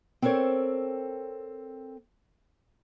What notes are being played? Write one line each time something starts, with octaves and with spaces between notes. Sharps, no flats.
C4 A4 A#4 C5 C#5